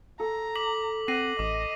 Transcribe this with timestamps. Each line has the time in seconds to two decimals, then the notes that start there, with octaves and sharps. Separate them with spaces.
0.20 A4 A#5
0.56 D6 B6 F#7
1.08 C4 F#5 A#6 C7 D#7
1.39 A1 D#5 D6